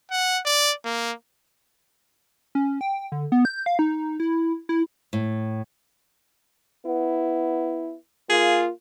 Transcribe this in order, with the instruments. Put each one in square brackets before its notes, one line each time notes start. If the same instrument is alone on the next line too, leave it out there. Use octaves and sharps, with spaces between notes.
[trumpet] F#5
D5
A#3
[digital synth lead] C#4
G5
D3
B3
G6
F5
D#4
E4
E4
[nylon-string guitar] A2
[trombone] B3 [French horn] E4
[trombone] A#3 [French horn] F4 [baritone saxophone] G#4